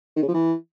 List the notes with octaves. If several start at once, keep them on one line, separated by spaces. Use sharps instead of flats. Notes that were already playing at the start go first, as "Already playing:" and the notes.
D#3
C#3
F3
E3